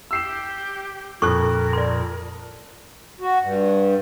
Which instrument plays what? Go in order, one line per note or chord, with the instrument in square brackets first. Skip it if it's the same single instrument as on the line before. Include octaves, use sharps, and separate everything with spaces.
[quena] G4 [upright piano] E6 C7 E7
[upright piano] F2 F#6 [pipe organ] A#2 [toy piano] A4 C#6 [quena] A#4
[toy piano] D5 C6
[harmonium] F#4
G2